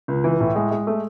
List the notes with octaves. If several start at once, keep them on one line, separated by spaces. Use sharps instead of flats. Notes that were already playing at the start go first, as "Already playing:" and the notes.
C#2
E3
A2
G#3
G#3
A3